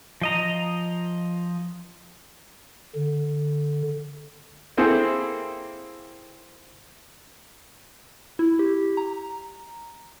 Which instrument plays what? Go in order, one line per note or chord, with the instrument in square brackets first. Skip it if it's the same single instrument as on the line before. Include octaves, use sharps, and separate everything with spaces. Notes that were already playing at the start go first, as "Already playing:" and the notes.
[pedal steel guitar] F3 D#5 A#5
[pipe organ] D3
[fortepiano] A#3 C4 E4 G#4 A4 C5
[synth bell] E4
G4
A#5